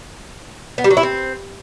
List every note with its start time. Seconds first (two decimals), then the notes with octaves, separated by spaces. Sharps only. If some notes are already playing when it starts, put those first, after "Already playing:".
0.78 B3
0.84 G3
0.91 F#3
0.97 E4
1.03 C4